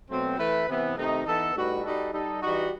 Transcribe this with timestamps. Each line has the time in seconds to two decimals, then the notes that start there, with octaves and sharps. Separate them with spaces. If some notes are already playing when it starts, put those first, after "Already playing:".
0.10 B2 F#3 A3 C4
0.38 E3 A3 E4 B4
0.67 C3 E3 B3
0.96 C3 D#3 A3 D#4
1.25 E3 B3 D#4 A4
1.54 A2 G3 D#4 F#4 B4
1.84 G3 D#4 F#4 A4
2.12 G3 D#4 A4
2.42 E3 G3 D#4 F#4